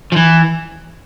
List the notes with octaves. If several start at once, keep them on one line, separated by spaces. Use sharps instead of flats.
F3
E3